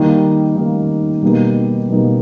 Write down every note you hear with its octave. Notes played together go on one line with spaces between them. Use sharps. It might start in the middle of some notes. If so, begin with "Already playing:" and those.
Already playing: D#3 G3 A#3 D#4
D#3 G3 A#3 D#4
B2 G3 A#3 D#4
B2 G3 A#3 D#4